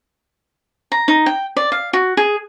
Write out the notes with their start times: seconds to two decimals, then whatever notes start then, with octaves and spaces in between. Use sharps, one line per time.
0.92 A#5
1.08 D#4
1.26 G5
1.57 D5
1.72 F5
1.93 F#4
2.17 G#4